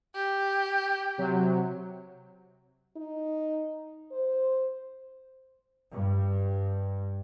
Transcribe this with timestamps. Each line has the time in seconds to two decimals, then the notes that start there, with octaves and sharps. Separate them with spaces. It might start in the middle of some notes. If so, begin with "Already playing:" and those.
0.15 G4
1.18 C3 F#3
2.96 D#4
4.12 C5
5.92 G2